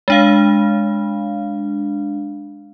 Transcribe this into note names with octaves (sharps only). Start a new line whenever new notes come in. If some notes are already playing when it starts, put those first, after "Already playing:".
G#3 D4 F5